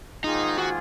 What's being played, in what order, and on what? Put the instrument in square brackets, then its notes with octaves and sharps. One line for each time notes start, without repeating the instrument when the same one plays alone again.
[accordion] G#2 D#3 A#3 F4 G#4 [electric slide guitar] D#4
[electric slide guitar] F#4